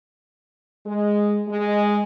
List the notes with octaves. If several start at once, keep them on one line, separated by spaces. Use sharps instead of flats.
G#3
G#3